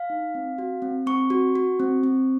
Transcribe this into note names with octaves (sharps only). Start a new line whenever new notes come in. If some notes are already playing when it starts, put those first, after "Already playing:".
Already playing: F5
D#4
C4
F#4
C4
C4 C#6
F#4
F#4
C4
C4